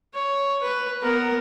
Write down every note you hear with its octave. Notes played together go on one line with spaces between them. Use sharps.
C#5
B4
B3 A#4